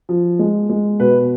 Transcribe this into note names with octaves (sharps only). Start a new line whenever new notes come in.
F3
G#3
G#3
B2 B4